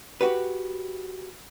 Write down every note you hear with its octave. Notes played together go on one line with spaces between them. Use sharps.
F#4 G4 B4